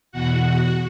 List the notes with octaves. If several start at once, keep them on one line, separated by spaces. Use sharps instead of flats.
E2 B2 F#4 F#5